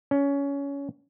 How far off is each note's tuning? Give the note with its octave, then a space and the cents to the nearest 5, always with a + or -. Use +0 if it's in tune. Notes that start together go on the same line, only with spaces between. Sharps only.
C#4 +20